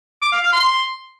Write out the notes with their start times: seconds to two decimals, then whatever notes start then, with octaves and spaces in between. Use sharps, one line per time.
0.22 D6
0.32 F5
0.42 F5
0.53 C6